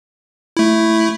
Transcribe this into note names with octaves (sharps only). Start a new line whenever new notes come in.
A3 E4